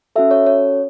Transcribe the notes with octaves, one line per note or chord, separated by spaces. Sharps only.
C#4 F#4 A4 E5
C#5
C#5